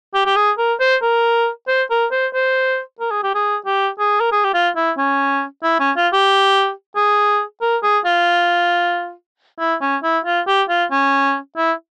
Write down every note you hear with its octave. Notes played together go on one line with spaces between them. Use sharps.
G4
G4
G#4
A#4
C5
A#4
C5
A#4
C5
C5
A#4
G#4
G4
G#4
G4
G#4
A#4
G#4
G4
F4
E4
C#4
E4
C#4
F4
G4
G#4
A#4
G#4
F4
E4
C#4
E4
F4
G4
F4
C#4
E4